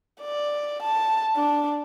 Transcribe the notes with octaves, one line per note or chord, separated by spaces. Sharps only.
D5
A5
D4